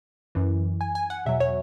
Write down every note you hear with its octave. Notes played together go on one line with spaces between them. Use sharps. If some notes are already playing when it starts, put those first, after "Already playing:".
F#2 E3
G#5
G#5
F#5
E2 B2 F#3 E5
C#5